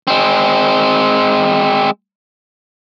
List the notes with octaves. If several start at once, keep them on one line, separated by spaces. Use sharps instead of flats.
G#3 C4